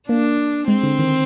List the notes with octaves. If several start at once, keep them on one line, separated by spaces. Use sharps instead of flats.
A#3 D4
G#3 C4
D3
D#3